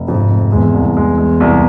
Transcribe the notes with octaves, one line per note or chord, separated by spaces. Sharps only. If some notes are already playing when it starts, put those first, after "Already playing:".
Already playing: F1
F2 G#2
F1
E2 G#3
C2
E2 G#3
G#3
C2